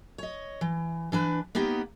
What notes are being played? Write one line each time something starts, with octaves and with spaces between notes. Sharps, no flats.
C#5 D#5
E3
E3 D4 B4
A#3 B3 D#4 G4